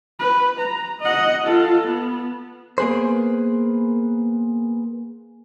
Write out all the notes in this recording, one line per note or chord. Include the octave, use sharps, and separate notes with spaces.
B4
A#5
D#5 F#5
F4 A4
B3
A#3 B3 G#4 B4 C5